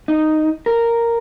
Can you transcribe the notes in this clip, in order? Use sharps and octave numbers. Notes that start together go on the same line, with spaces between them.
D#4
A#4